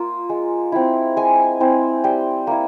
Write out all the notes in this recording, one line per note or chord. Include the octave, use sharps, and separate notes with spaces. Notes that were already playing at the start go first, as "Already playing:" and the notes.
Already playing: A#3 F4
G#3
C4 E4
G#3 G#5
C4 E4
G3 G5
A#3 E4